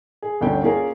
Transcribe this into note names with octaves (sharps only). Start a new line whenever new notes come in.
G#4
G1 D2 D3 C#4 G5
A#3 C#4 F4 G#4 A#4